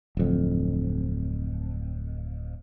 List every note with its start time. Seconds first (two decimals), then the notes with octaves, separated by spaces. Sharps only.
0.17 D1 F2